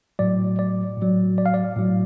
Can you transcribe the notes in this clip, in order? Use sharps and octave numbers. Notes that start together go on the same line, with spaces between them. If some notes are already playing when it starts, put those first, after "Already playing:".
A2 F#3 D5
D5
A2 F#3
D5
F5
D5
A2 F#3